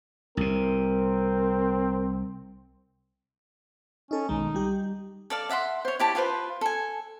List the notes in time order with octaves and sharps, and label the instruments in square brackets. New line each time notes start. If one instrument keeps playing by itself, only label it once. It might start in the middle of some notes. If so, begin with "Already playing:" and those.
[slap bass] C2 C3 [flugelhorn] C4 [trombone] A#4
[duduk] C#4 [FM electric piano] D#4 A4
[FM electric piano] B1 D#3 G#3 [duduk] D#4
[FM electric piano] G3 G4
[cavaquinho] A4 D5 F5
D5 E5 F#5 C6
C5 C#5
E4 G4 A5
F4 G4 B4 C5
A4 G#5